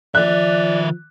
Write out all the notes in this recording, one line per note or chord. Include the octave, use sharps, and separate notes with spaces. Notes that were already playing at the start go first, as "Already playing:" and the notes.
D#3 F3 D5 E5 F#6